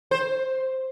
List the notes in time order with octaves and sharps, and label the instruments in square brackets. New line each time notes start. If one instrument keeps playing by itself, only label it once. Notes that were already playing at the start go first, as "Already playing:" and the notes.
[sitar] C5